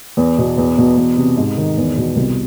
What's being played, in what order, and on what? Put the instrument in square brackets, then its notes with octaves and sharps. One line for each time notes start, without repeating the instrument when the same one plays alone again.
[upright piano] E2
B2
E2
B2
E2
C3
G#2
D#3
E2
B2
C2